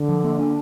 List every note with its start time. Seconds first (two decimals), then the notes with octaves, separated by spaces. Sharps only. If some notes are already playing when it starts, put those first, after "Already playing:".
Already playing: D3
0.09 F3
0.24 A#3
0.39 D4